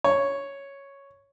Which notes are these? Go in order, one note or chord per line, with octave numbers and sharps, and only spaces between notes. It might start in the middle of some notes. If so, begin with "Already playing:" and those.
C#5